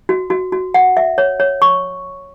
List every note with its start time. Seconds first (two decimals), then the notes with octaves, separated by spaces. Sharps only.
0.09 F#4
0.30 F#4
0.52 F#4
0.74 F#5
0.97 E5
1.18 C#5
1.40 C#5
1.62 C#6